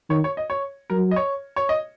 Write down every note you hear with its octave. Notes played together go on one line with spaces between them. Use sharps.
D#3 C#5
C#5
D#5
C#5
F#3 A#4
D#5
C#5
C#5
D#5